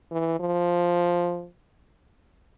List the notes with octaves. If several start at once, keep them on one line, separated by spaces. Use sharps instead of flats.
E3
F3